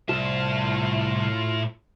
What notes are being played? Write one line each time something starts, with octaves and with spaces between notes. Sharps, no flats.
C2 A2 F4 A5